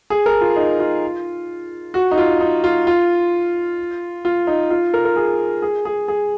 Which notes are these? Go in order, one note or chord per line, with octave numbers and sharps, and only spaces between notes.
G#4
A#4
F4
D#4
F4
F#4
D#4
F4
D#4
F4
F4
F4
D#4
F4
A#4
A#4
G#4
G#4
G#4
G#4